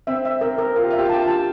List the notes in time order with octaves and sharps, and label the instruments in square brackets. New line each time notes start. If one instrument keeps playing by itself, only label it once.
[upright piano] C4 [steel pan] E5
[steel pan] E5
[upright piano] C4 [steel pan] A#4
[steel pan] A#4
[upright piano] F4 [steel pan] A#4
[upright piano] G4
[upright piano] F4 [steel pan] E5
[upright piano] G4
F4
[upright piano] G4 [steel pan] A5
[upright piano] F4
[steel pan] A5